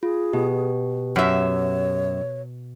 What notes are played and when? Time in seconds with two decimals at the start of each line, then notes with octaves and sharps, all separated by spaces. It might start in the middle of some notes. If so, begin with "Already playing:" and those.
0.03 F4 G#4
0.33 B2 G4
1.16 F#2 C#5 E5